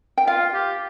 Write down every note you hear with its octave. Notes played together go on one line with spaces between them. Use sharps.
G5
F4 F5
G4